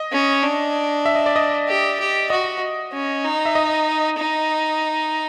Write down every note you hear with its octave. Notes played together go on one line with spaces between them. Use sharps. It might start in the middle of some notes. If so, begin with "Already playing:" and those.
Already playing: D#5
C#4
D4
E5
D#5
D5
D#5
G4
G4
F#4 D#5
C#4
D#4
E5
D#5
D#4